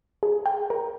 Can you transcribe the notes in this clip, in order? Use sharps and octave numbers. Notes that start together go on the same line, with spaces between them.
G#4
G5
A#4